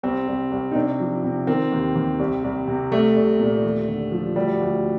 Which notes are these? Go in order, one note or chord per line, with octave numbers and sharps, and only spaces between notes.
C2 C4
C2
C2
D#4
C3 D4
F3
C3
D#3 C4
D#2
D#2
C2
C2
C3
C2 A3
C2
A#2
D#2
D3
F3
D2 G3
D2